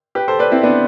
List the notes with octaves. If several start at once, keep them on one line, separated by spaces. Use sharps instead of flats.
G4 B4
A4 C5
B4 D5
C4 E4
B3 D4